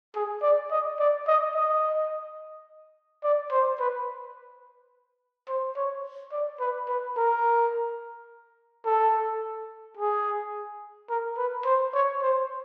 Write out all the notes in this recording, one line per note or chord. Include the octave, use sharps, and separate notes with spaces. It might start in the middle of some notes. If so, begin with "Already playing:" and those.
G#4
D5
D#5
D5
D#5
D#5
D5
C5
B4
C5
C#5
D5
B4
B4
A#4
A4
G#4
A#4
B4
C5
C#5
C5